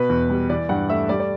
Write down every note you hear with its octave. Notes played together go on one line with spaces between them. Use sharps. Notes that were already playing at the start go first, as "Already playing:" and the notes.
Already playing: B2 B4
E2
G3
E3 D5
G2 F#5
A3 E5
G3 D5
D5